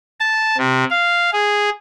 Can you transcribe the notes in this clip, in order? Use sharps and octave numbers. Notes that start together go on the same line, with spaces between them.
A5
C3
F5
G#4